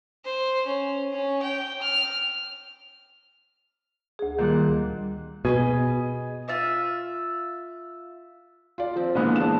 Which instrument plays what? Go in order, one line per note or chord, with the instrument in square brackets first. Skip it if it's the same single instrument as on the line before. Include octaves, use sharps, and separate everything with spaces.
[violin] C5
C#4
C#4
G5
F6
[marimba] D2 G#4
[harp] A#2 G3 F#6 [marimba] D#3
[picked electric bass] B2 [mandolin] G#4 B4 D#5
[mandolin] F4 E5 F5
[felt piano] F4 D5
F3 C4
A#2 D3 E3 G#3 B3 E4
D4 E7